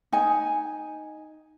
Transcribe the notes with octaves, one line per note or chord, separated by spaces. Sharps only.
D#4 G#5